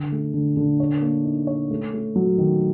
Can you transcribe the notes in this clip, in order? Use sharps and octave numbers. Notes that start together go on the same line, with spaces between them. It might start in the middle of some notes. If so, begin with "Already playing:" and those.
Already playing: D3
A3
D3
D3
C#5
A#3
D#4
C#5
A3
A3
F#3
D#3